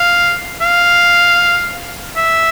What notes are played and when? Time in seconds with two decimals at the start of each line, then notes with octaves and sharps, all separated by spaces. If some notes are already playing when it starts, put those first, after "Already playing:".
Already playing: F5
0.61 F5
2.16 E5